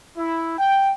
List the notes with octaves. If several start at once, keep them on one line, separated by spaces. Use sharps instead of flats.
E4
G5